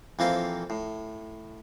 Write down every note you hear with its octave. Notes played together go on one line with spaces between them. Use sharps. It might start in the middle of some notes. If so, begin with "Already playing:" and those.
F2 E3 A#3 C4 F4 F5
A2